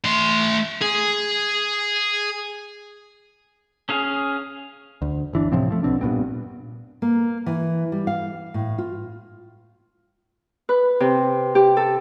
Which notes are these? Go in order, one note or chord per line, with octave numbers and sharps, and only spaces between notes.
A3 C6
G#4
C#4 G#4 F5
D2
G1 E3 D4
A2 C3 F3 C4
F3 A3
B1 B2 C4 D4
G2 A#2 B3 C4
A#3
E3
G3
F5
A2
F4
B4
C3
G4
A4